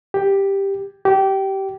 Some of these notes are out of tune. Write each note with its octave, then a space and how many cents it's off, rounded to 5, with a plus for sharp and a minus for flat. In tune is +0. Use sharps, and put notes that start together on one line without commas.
G4 +5
G4 -20